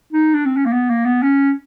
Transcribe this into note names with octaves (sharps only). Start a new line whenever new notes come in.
D#4
D4
C4
C#4
A#3
B3
A#3
B3
C#4